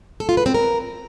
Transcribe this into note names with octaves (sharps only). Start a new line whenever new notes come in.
A4
F4
B4
C4
A#4